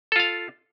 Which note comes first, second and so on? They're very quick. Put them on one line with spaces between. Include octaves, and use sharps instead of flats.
A4 F4 F5